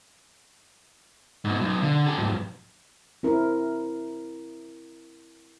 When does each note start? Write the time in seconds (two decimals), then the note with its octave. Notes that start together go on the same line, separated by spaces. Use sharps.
1.45 G#2 B2
1.61 B1
1.82 D3
2.06 G4 A4
2.18 F2 G#2
3.23 C4 E4 A#4